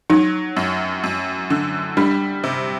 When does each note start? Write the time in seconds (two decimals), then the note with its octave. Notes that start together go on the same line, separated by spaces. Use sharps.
0.10 F#3 D#4
0.57 F#2
1.04 F#2
1.50 D3
1.97 G3 D4
2.44 C3